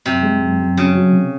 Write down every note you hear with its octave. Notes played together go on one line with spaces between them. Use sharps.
F#2 C3
G#3
F#2
F#2
C#3 F#3
F#3
C3